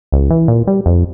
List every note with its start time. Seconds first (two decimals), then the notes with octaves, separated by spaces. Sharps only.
0.12 C#2
0.30 E3
0.48 A#2
0.67 G3
0.86 F2